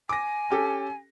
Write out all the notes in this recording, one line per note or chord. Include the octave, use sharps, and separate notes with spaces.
G#5 D6 A#6
C#4 G4 A4